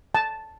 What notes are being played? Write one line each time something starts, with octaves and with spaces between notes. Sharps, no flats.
A5